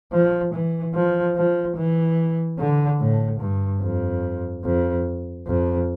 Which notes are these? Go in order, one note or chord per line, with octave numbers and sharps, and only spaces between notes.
F3
E3
F3
F3
E3
D3
A2
G2
F2
F2
F2